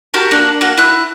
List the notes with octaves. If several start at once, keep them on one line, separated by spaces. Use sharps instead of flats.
F#4 G4 A#4 A5
A#3 D4
A#3 F#4
E4 F#6